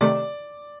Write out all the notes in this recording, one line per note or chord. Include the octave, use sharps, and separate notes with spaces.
C3 D#3 A3 D5